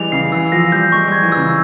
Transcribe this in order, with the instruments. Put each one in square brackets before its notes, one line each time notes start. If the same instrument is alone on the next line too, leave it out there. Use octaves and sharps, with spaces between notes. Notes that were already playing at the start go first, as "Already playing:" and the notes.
Already playing: [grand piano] E3 G3 G#3 [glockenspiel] F7
[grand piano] C#3 [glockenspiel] C7
[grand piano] E3 [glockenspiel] E6
[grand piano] F3 [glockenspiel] A#6
[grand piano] G3 [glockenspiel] G6
[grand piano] G#3 [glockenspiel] C#6
[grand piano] G3 [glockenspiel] G#6
[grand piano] E3
[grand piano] C#3 [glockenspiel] E6